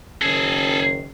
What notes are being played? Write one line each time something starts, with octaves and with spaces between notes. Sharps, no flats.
F#1 D#3 C#4 G#4 A4